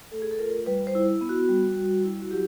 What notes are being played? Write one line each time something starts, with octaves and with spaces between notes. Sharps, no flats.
A3 A4
G#4
A4
F4 A#4
G3 B4
C5
E4
B3
F#4
G3
G3
E4
F#4
F#3 G4